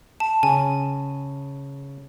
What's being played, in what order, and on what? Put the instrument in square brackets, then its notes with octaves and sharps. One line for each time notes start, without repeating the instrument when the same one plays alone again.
[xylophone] A5
[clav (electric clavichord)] C#3 [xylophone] G#5